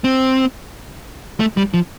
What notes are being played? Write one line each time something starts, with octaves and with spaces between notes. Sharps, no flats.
C4
A3
G3
F3